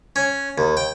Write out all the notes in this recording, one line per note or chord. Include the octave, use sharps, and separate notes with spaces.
C#4
D#2
G5